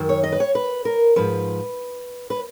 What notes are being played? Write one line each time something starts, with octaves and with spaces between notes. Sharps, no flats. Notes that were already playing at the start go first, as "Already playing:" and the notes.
Already playing: F#2 D#3
C#5
D#5
B4
C#5
B4
A#4
G#2 F3 B4
B4